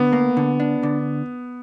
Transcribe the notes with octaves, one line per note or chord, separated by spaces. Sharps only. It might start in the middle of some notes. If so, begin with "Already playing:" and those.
Already playing: D3 B3
A#3
D3
D4
D3